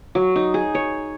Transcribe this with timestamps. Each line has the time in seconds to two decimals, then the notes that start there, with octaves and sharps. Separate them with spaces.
0.15 F#3
0.36 D#4
0.54 G#4
0.75 C#5